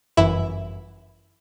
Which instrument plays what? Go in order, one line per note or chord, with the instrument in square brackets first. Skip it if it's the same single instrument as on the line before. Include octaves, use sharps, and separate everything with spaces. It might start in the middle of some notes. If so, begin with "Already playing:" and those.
[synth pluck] G1 F#2 E3 E4